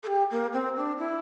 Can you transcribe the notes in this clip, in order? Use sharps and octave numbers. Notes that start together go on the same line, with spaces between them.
A4
G4
A#3
C4
D4
E4